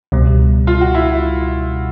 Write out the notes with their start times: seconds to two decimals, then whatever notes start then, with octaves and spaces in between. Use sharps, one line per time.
0.12 C#2 B2 G3
0.67 F4
0.81 F#4
0.94 E4